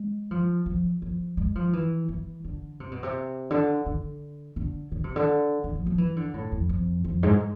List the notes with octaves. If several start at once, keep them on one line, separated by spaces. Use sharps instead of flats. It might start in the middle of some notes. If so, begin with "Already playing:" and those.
Already playing: G#3
F3
F3
F3
G#3
F3
E3
E3
D3
C3
B2
C3
D3
D3
D3
D3
C3
D3
D3
F3
F3
E3
D3
A2
F2
F2
F2
G#2